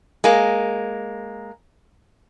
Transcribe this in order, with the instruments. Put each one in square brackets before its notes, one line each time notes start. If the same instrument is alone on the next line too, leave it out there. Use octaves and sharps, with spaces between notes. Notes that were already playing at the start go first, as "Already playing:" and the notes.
[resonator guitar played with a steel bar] G#3 A#3